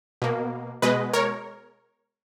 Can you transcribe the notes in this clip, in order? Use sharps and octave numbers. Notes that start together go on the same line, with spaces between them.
B2 A#3
B2 G#3 B4 D#5
A#4 C#5